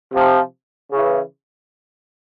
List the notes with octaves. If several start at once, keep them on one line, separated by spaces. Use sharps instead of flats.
C3 F3
C#3 E3